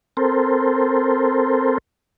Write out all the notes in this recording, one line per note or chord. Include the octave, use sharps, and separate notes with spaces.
C4 A4 A#4 C5